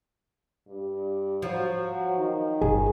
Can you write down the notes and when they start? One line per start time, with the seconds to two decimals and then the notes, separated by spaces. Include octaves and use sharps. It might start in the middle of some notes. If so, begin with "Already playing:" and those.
0.67 G2
1.42 F3 F#3
2.17 D#3
2.61 G1 G#4